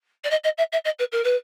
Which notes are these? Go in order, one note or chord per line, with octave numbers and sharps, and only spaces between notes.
D5
D#5
D#5
E5
E5
D#5
B4
A#4
B4